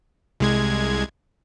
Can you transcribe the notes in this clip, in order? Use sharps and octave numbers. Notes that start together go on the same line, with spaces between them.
C2 G#3 G#6